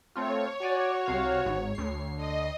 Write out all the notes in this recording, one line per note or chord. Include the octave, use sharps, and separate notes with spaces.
A3 C4 F4 C#5
F#4 D5 G#5
C2 C3 F5
G#1 G#2
D2 C7
D3 D#5